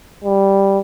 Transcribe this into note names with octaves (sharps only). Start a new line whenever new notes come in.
G3